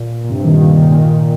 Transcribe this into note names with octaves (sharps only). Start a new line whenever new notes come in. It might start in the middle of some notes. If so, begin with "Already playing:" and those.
Already playing: A#2
A#2
G2 C3
A#2 D#3
A#2 D#3
A#2 D#3
A#2 D#3